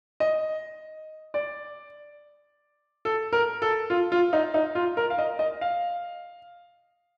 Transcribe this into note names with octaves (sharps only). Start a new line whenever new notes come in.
D#5
D5
A4
A#4
A4
F4
F4
D#4
D#4
F4
A#4
F5
D#5
D#5
F5